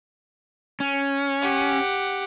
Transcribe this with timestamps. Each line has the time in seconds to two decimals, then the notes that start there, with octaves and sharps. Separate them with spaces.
0.80 C#4
1.42 G4 F#5